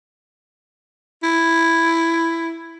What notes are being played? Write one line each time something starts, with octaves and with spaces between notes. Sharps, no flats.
E4